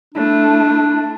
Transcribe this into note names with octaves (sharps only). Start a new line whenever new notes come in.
A3 D4 E4